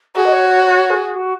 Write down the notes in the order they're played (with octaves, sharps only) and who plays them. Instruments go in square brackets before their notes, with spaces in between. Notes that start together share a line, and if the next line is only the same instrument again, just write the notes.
[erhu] F#4 [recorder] G#4
[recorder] D#5
C#5
C#5
C#5
G#4
F#4